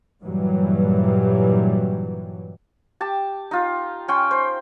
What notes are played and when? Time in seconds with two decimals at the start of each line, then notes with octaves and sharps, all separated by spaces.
0.22 G2 A#2 E3 F#3 G3
3.01 G4 A5
3.51 D#4 F4
4.08 C#4 G5 C6
4.31 C5